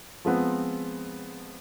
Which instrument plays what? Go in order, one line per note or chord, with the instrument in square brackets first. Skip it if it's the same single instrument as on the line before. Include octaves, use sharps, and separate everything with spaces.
[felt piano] F3 G#3 B3 C4